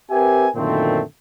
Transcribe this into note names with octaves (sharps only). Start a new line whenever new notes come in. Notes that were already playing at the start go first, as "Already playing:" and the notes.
C4 G4 A#4 B4 E5 G#5
F#2 A#2 D3 D#3 A3 C4